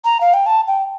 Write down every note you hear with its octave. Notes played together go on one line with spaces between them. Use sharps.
A#5
F5
G5
A5
G5